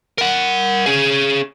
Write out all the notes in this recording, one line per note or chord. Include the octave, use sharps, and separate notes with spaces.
A#4 F#5
C#4 G#4